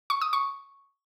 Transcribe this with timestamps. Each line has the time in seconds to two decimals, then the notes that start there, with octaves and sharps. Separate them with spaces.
0.10 C#6
0.21 D#6
0.33 C#6